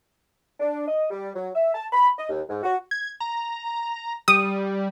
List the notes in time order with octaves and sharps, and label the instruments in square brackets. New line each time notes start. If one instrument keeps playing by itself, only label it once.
[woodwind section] D4
D#5
G3
F#3
E5
A5
B5
D#5
D#2
G#2
F#4
[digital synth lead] G#6
A#5
[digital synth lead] G3 [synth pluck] D#6